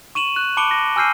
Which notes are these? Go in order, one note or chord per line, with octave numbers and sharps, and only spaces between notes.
C#6 D#7 E7 F#7
F#6
A5 B5 D6 C#7 D7 G7
A#6
G#5 E6 F6 G6 C7 D#7